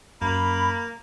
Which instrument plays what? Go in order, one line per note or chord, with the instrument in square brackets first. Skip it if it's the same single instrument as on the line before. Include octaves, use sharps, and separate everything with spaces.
[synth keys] F#2 [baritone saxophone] A#3 [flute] B5